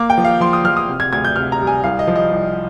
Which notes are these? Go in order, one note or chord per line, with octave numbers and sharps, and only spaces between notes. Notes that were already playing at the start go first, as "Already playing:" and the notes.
Already playing: A#3 D6
G5
F3
F5
F3 C6
D#6
F3 F6
D#6
C3
G#6
D2 G#6
G6
C3 F6
A#5
G3
G#5
C2 F5
D#5
F3
D#5
C2